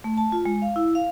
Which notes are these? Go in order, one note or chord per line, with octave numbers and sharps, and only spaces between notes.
A3
A5
F4
G#3
F5
E4
F5